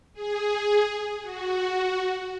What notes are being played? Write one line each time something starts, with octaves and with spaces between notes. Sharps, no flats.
G#4
F#4